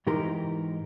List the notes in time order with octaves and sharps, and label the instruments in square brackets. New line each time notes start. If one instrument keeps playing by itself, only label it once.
[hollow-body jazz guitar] G#2 E3 D#4 G4 A#4 C6